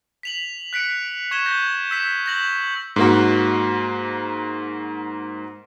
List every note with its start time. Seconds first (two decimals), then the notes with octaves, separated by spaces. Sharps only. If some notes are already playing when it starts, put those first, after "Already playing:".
0.23 B6 F7 F#7
0.73 F#6 B6 C#7 D7
1.31 C#6 G#6 B6 E7 G7
1.46 G6 A#6
1.91 E6 B6 E7
2.26 G6 A#6 F#7
2.96 G#2 A#3 F#4